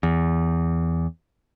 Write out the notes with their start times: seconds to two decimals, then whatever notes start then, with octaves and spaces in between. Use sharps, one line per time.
0.03 E2